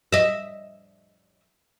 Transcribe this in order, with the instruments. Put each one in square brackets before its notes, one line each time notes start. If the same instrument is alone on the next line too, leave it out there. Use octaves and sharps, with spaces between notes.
[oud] D#5 E5